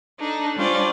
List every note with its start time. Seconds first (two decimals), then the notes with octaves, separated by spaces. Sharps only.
0.19 D4 D#4 A4
0.57 G3 C#4 D4 F4 C5 D5